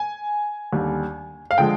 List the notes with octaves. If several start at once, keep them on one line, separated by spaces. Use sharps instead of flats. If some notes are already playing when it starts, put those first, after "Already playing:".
Already playing: G#5
D#2 D3 G3
F5
D3 F3 G#3 G5